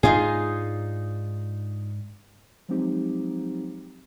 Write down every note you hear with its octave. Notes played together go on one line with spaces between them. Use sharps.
G#2 D4 D#4 F4 G#4
F3 F#3 G#3 C4 D#4 G4